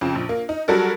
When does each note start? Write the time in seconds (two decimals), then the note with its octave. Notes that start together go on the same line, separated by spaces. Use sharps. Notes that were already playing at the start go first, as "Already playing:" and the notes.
0.01 F2 C#3
0.15 A#1
0.29 A#3
0.49 D#4
0.68 F#3 G3 F#4 A4 A#4